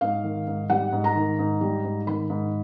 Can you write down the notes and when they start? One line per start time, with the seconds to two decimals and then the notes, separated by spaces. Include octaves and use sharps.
0.01 G#2 F5
0.24 D#3
0.47 G#2
0.70 G3 F#5
0.93 G#2
1.04 A#5
1.16 D#3
1.39 G#2
1.61 G3
1.84 G#2
2.07 D#3 B5
2.30 G#2